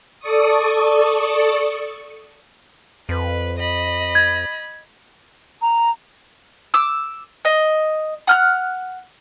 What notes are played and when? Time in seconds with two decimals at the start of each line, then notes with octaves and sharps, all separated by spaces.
0.20 A4 D5 C#6 D#6
3.09 F2 B4
3.59 D#5 B5
4.15 G#6
5.62 A#5
6.74 D6 E6
7.45 D#5
8.27 F#5 F6 F#6